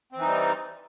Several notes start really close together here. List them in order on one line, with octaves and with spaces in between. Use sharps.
C4 E3 D#4 G3